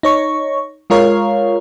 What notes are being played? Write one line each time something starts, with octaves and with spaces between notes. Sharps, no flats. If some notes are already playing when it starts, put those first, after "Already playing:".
D#4 C#5 C#6
G#3 F4 A#4 C#5 F5